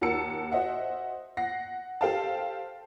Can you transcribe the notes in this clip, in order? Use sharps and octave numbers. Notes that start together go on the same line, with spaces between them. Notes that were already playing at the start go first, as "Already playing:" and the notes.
D#2 F#4 A#4 A5 E6 C#7
F#4 C5 D#5 E5 F#5
F#5 A#6 C7
G4 A4 C5 F5 G5 A5